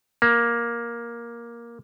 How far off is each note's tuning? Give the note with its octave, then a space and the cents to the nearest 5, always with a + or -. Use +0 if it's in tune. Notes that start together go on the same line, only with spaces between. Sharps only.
A#3 +10